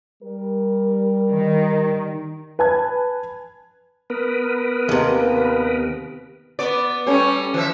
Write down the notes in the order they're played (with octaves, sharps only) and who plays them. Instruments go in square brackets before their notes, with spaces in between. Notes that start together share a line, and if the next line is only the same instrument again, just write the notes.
[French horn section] G3 A#4
[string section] D#3
[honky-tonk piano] B4 G#5 A5 G#6
[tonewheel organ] B3 A#4 B4
[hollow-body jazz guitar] D#2 C3
[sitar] B3 D5
G3 A3 C#4
E3 F3 E5